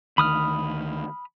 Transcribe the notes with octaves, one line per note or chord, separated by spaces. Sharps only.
D2 D#3 B5 D#6 F6